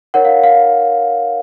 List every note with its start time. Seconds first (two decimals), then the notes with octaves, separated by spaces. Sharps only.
0.14 D#4 A#4 C#5 F#5
0.25 F5
0.43 F5